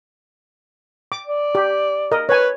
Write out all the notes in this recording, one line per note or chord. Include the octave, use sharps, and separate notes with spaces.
D6
D5
G4
A#4 D#5
B4 C#5 G#5